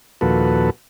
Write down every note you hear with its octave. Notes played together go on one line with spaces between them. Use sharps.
D#2 A#2 F3 F#4 A4 B4